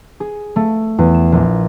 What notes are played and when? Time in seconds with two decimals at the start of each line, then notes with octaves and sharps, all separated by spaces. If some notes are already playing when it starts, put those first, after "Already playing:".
0.20 G#4
0.56 A3
0.98 E2
1.14 E7
1.32 A#1